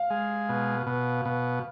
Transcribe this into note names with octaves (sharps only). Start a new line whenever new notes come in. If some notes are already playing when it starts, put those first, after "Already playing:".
Already playing: F5
G#3
B2
B2
B2